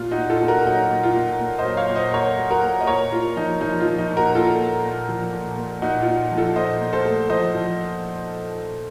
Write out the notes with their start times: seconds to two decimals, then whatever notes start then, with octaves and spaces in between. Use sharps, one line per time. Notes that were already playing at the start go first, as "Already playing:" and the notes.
Already playing: A#2 F4
0.11 D#4 F#4
0.17 A#2
0.30 F4 A4
0.42 A#2
0.48 F#4 A#4
0.66 F#3 D#4 F#4
0.91 A#2
1.03 F4
1.16 A#2
1.40 A#2
1.59 C5 D#5
1.65 F#3
1.77 C#5 F5
1.89 A#2
1.95 C5 D#5
2.14 F#3 A#4 C#5
2.38 F#3
2.51 F#4 A#4
2.63 A#3
2.81 D#5
2.87 A#2 A#4 C#5
3.12 A#3 F4
3.37 F3 D#4
3.61 F3 D#4
3.80 F4
3.86 F3
3.98 D#4
4.10 A#2
4.17 F#4 A#4
4.35 A#3 F4 A4
4.59 A#2
4.84 A#2
5.09 F3
5.33 A#2
5.58 A#3
5.82 A#2 D#4 F#4
6.01 F4
6.07 A#2
6.31 F3
6.37 F4 A4
6.56 A#2 C5 D#5
6.81 A#2
6.93 A4 C5
7.05 A3
7.30 F3 C5 D#5
7.55 F3